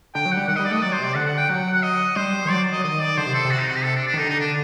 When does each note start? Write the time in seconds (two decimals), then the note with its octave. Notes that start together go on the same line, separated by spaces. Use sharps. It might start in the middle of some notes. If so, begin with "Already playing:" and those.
0.15 D3 G5
0.25 F#3
0.32 F#5
0.37 G3
0.48 D#3 F#5
0.56 G3 D#5
0.65 D5
0.71 A3 D#5
0.82 F#3 D5
0.93 C5
0.99 C3
1.04 D5
1.15 D3 F#5
1.26 F#5
1.38 G5
1.49 F#3 F#5
1.74 F#5
1.83 D#5
2.16 G3 C5
2.33 G3
2.45 D#3
2.50 F#3 D5
2.72 D#5
2.77 F#3
2.84 D#3 D#5
3.01 D5
3.17 D3 C5
3.26 C3
3.34 A4
3.45 C3
3.51 F#4
3.59 D#4
3.68 F#4
3.76 G4
3.84 A4
3.96 D4
4.07 D4
4.14 D#3
4.18 D3 D#4
4.29 D#4
4.40 D4